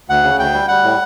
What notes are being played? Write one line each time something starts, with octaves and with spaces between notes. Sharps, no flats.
D2 F#5
C#3
D2 G5
G3
G3 F#5
A2